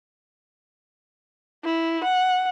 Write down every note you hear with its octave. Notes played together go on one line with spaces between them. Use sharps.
E4
F#5